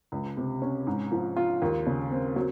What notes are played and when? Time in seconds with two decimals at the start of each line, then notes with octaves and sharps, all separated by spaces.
0.12 C#2
0.37 C3
0.62 C#4
0.87 G#2
1.12 F3
1.36 F4
1.62 D#2
1.87 C#3
2.11 C4
2.36 F#3